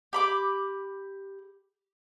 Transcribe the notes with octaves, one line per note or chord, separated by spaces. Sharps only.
G4 B5 D6